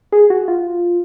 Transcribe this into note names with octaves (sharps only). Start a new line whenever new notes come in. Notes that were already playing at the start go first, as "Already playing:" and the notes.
G#4
F#4
F4